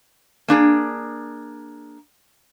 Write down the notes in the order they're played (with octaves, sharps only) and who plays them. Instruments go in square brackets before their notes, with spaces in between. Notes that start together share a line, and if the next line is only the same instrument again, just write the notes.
[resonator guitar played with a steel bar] A#3 D4 G#4